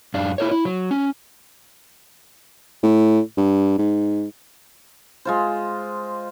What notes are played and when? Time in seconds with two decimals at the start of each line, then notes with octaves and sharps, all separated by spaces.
0.14 F#2 D4 F5
0.38 E4 A#4 C#5
0.51 E4
0.65 F#3
0.91 C#4
2.83 A2
3.37 G2
3.78 G#2
5.25 G#3 F4 C5